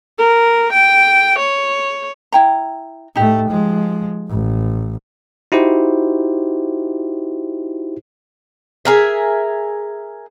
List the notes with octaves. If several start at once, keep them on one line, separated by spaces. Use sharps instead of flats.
A#4
G5
C#5
E4 G5 A#5
A2 A3 D#4 G4
F3 G#3
A1
D#4 E4 F#4 G4 C5
G#4 A#4 E5